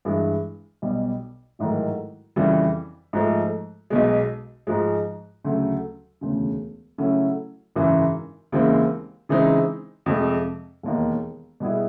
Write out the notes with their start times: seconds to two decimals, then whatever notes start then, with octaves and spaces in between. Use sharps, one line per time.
0.05 G2 E3 G#3
0.82 B1 B2 G3
1.59 A1 G#2 D#3 F#3 A3
2.36 F2 C#3 E3 G3
3.13 G#2 F3 A3
3.90 B1 B2 G#3
4.67 G#2 F3 G#3
5.44 D2 C#3 F#3 A3
6.21 E1 D2 C#3
6.98 C#3 F#3 A3 C#4 E4
7.76 G#1 F#2 C#3 E3
8.52 D#2 C#3 E3 G#3 C4
9.29 C#3 E3 G#3 C4 D#4
10.06 F2 C3 F3 G#3
10.83 E1 D#2 D#3
11.60 B2 G3 B3 E4 G#4